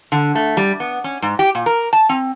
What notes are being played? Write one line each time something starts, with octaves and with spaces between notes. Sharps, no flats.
D3
A3
G3
B3
C#4
G#2
G4
A#2
A#4
A5
C4